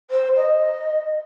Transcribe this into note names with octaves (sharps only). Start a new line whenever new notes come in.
C5
D#5